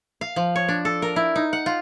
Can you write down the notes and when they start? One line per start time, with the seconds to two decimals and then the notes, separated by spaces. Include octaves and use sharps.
0.21 F5
0.36 F3
0.56 C#5
0.68 D4
0.85 A4
1.02 A#4
1.16 E4
1.36 D#4
1.53 F#5
1.66 F4